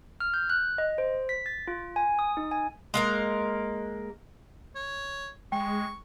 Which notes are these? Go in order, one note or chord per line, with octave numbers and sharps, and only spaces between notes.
F6
G6
F#6
D#5
C5
B6
A6
F4
G#5
D#6
D#4
G#5
G#3 A#3 A#4
C#5
G#3 G5 C#6